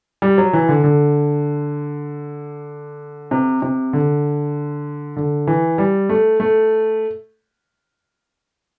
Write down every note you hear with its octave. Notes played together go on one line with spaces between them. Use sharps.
G3
F#3
E3
D3
D3
C3
C3
D3
D3
E3
G3
A3
A3